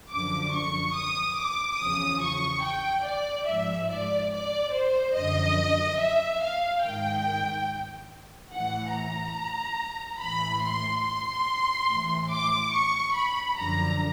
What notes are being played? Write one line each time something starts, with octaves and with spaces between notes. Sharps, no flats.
F#2 D3 F3 D6
C#6
D#6
D6
E2 C#3 F3 D#6
C#6
G5
D5
G#2 F3 E5
D5
D5
C5
F#2 D3 F3 D#5
E5
F5
G#2 D#3 G5
A2 E3 F#5
A#5
A2 E3 B5
C6
C6
A2 E3
D6
C#6
B5
F#2 D3 F3 A#5